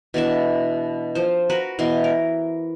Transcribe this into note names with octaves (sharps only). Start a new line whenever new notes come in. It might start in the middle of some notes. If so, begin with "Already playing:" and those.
B2 E3 D4 E5
F3 C5
F#4 A#4 B4
B2 E3 C6
A#4